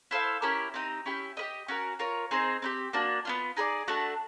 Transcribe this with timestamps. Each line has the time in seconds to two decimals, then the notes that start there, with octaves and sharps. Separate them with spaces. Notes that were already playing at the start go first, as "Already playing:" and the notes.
0.11 E4 A4 C5 F5
0.42 C#4 E4 G4 A#4
0.74 C4 D#4 G4
1.06 C#4 E4 G4
1.37 G4 B4 D#5
1.68 C#4 F#4 A#4
1.99 F4 A#4 C#5
2.31 C4 D#4 G#4 C5
2.62 C4 D#4 G4
2.93 A#3 D4 F#4
3.25 B3 D4 F4
3.57 D#4 G#4 B4 D5
3.88 A3 D4 F#4